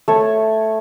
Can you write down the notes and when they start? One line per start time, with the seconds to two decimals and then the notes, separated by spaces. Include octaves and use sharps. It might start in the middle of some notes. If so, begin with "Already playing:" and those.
0.08 A3 C#5